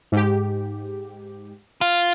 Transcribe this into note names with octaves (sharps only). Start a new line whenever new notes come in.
G#2 G4
F4